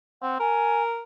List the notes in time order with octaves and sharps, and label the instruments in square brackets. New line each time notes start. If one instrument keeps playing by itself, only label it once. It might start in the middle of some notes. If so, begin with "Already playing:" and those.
[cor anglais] C4 [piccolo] F#5
[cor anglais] A#4 [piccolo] G#5